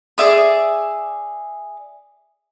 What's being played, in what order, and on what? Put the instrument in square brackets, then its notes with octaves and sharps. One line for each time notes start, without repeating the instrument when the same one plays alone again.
[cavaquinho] G#4 D5 E5 D#6